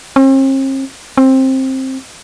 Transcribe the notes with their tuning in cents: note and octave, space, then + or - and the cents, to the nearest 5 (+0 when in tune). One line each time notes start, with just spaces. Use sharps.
C4 +45
C4 +15